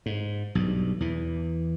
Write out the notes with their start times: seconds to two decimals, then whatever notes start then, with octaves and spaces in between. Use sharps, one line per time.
0.06 G#2
0.55 B1 G2
1.00 E2 E3